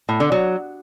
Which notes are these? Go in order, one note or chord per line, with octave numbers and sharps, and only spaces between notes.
A2
D3
F#3